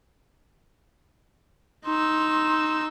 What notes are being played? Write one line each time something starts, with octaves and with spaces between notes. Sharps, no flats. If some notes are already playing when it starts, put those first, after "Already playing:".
D#4 C6 E6